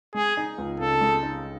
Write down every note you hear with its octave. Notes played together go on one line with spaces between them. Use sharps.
G#3 G#4
D#4
C#2
C#3 A4
G#3
D#4